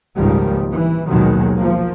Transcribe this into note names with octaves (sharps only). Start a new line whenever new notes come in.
G#1 C#2 A#2 D#3 F3 G3
E3
A#1 D#2 B2 D#3 F#3 G#3
F3 A#3